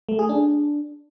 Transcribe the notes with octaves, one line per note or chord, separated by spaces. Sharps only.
A3
G#4
D4